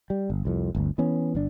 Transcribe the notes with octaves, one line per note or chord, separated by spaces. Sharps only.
G3
G1
C2 F2
G1 D2
E3 B3 C#4
G1 D4